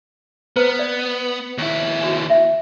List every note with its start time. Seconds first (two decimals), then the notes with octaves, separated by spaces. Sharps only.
0.56 B3 B4 C5 A#5
0.79 D5
1.58 D#2 E4
2.04 D4 F#4
2.30 E5